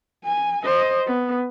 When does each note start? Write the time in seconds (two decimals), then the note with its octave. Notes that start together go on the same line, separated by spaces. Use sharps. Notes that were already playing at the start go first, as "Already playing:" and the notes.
0.24 G#5
0.64 C5 D#5
1.07 B3